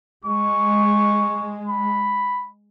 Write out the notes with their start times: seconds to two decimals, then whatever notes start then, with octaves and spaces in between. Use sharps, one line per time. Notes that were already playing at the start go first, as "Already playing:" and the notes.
0.25 G#3 C#6
1.68 B5